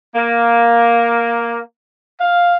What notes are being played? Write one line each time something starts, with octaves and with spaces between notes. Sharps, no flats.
A#3
F5